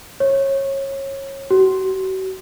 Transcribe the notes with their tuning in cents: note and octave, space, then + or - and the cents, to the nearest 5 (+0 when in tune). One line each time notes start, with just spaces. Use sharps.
C#5 -25
F#4 +40